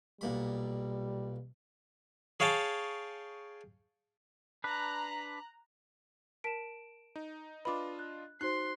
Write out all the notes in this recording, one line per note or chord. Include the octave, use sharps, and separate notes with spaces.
B1 A#2 G3 B5
G#4 C#5 F5 G5 A5
D4 B4 A#5 F#6
A#4 A5 B6 D7 E7
D#4
D4 F4 B4 D#5 B5 D6
F#6
D#4 F#4 C5 C6 F#6